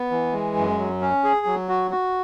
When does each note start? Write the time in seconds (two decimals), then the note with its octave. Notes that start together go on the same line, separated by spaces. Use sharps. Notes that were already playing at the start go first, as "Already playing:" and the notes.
Already playing: B3
0.11 E3
0.33 G#3
0.57 F#2
0.79 F#3
1.01 C#4
1.24 G#4
1.46 F#3
1.69 F#4
1.91 F#4